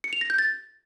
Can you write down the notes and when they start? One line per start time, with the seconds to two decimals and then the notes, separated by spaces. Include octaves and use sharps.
0.04 C#7
0.13 F7
0.21 A#6
0.30 G6
0.39 A6